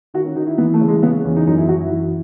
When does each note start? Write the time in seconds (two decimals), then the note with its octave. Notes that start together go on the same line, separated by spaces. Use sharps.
0.14 D#3 F#4
0.25 C#4
0.35 D#3 D#4
0.47 E4
0.58 E3 B3
0.74 A3
0.81 C#3
0.88 G#3
1.03 C#3 B3
1.25 E2 C#4
1.36 D#4
1.47 F#2 D#4
1.58 E4
1.68 F#2 F#4
1.80 E4
1.91 E3